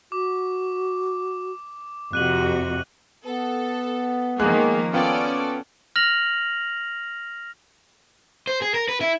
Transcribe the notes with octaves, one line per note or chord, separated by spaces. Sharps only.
F#4 D6
F2 C3 F#4 G4 F#6 D#7 F#7
B3 A4
D#3 F3 G#3 A#3 G#4 F#6
B3 C#4 F4 A4 D5 G5
F6 A#6 F7 F#7
C5
G#4
A#4
B4
E4